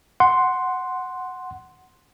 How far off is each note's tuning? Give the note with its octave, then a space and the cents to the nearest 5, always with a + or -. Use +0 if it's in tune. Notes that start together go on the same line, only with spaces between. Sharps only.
F#5 +0 C6 +0